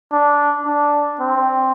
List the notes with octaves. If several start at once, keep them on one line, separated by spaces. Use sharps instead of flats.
D4
D4
C4